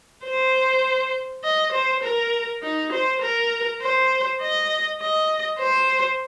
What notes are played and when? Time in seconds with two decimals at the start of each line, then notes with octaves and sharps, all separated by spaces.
0.24 C5
1.44 D#5
1.72 C5
2.03 A#4
2.63 D#4
2.92 C5
3.22 A#4
3.81 C5
4.41 D#5
5.00 D#5
5.59 C5